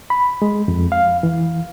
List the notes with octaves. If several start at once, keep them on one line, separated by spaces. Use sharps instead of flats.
B5
G#3
F2
F5
E3